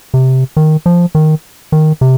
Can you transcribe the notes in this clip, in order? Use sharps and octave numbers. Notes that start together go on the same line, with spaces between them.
C3
D#3
F3
D#3
D#3
C3